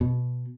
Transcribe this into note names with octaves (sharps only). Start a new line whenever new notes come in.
B2